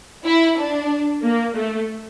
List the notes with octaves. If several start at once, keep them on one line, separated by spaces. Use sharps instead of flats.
E4
D4
A#3
A3